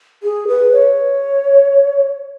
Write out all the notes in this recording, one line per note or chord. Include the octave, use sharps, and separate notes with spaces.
G#4
B4
C#5